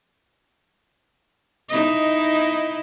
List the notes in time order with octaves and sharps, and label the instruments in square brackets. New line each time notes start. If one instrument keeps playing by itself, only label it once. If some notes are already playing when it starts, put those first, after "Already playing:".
[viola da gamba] D#4 E4 D#5